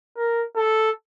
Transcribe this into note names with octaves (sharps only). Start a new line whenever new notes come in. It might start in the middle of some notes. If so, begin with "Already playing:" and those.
A#4
A4